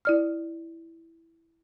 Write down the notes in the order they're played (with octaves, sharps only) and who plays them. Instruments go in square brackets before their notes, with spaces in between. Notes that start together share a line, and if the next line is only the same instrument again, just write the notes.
[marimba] E4 D5 F6